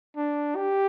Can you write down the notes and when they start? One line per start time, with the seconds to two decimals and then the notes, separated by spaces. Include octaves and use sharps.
0.16 D4
0.56 G4